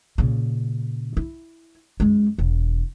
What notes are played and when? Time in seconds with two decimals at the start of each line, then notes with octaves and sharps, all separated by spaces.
0.18 A#2 C#3
1.17 E4
2.00 F#2 G#3
2.38 E1